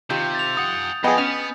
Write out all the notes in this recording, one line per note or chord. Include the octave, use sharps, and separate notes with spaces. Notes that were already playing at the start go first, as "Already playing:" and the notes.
C3 D#3 F4 G4 G6
A6 F7
F#5 G#5 D#6
F2 B3 G#4 D#5 F#5 G5
B3 C#4 F6